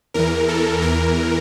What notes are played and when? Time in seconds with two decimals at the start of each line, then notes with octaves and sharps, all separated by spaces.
0.14 E2 E3 A#4
0.48 A4
0.82 E2 E3 A#4